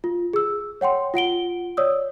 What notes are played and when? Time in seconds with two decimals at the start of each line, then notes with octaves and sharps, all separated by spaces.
0.04 F4
0.33 G#4 E6
0.81 C#5 F#5 G5 C6
1.14 F4 F#5 D7 G7
1.77 C#5 D5 D#6 E6